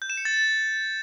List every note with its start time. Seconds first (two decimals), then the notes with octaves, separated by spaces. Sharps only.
0.02 G6
0.10 E7
0.17 C#7
0.25 A6